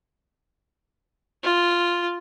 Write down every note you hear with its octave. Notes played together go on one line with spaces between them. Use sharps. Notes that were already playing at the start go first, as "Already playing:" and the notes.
F4